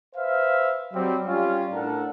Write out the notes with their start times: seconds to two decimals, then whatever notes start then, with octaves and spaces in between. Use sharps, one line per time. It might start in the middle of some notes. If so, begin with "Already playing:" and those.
0.16 B4 C5 E5 F5
0.93 F#3 G3 C4
1.28 G3 C#4 F4
1.73 A2 D4 A4 A#4 F#5 A5